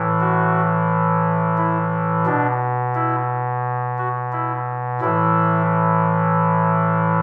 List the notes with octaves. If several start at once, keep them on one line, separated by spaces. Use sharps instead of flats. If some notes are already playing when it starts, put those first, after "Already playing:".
Already playing: A2 E3
F#4
E4
B2 D4
E4
F#4
E4
A2 E3 E4